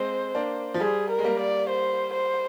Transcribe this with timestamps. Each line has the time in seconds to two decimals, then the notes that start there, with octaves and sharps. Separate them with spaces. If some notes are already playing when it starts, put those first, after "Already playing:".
Already playing: G#3 C4 C5
0.35 A#3 D4
0.74 F3
0.80 G3 G#4
1.10 A#4
1.19 G#3
1.24 G3 A#3
1.40 D5
1.69 C5
2.13 C5